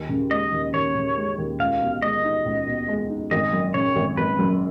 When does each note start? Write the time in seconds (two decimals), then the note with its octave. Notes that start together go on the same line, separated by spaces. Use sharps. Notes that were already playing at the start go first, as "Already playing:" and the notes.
Already playing: D#2
0.09 C#3
0.31 G#3 D#5
0.52 D#2
0.73 D#2 C#5
0.95 C#3
1.17 G#3
1.38 D#2
1.59 C#2 F5
1.81 B2
2.02 G#3 D#5
2.24 D#4
2.45 C#2
2.66 B2
2.88 G#3
3.09 D#4
3.31 G#1 D#5
3.53 F#2
3.74 C#3 C#5
3.96 G#1
4.17 G#1 B4
4.39 F#2